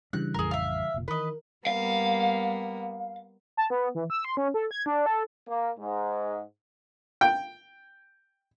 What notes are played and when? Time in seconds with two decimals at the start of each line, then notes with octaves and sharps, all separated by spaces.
0.13 C#3 E3 G3 D4 F#6
0.34 A1 F2 G#4 A#4
0.51 E5 F5
0.94 F1 A#2
1.08 D#3 E3 A#4 B4 D#5
1.67 G3 A#3 B3 F5
3.57 A5
3.70 B3
3.95 E3
4.10 E6
4.25 C6
4.37 C#4
4.54 A4
4.71 G#6
4.86 D4
5.06 A4
5.48 A#3
5.78 G#2
7.21 G5